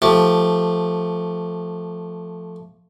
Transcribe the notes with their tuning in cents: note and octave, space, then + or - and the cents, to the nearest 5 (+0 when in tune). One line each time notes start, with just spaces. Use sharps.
F3 +0 A3 +0 G4 +0